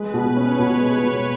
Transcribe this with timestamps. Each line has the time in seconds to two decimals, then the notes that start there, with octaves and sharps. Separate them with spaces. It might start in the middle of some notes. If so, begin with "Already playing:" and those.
Already playing: G#3 B4
0.14 B2
0.36 C#4 C#5
0.59 B2
0.81 G#3
1.03 B2